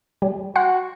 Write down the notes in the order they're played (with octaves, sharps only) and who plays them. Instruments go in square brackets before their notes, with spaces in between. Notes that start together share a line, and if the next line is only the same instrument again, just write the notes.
[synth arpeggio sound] G3
[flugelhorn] F#4 [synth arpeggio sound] F#5 C6